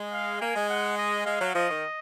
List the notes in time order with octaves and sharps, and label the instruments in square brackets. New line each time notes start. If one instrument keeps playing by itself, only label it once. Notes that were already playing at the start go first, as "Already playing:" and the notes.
Already playing: [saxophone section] G#3
[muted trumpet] F5
[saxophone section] A#3 [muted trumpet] G#5
[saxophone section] G#3
[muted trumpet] F#5
D#5
[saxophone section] G#3 [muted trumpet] F5
[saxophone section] F#3
[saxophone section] F3 [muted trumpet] D#5
[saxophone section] D#3